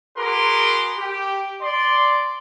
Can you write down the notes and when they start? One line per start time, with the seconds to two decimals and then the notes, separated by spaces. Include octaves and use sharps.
0.18 F#4 G#4 A#4 B4 C6 D6
0.99 G4
1.62 D5 C6